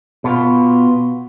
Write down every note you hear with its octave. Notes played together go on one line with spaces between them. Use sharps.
B2 B3 F4